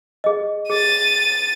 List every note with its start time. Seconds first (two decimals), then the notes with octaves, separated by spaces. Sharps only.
0.24 G#4 D#5
0.70 G#4 A6 D#7